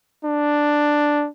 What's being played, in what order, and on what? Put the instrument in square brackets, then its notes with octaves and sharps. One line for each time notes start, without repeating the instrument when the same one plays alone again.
[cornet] D4